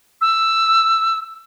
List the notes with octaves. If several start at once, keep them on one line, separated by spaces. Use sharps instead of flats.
E6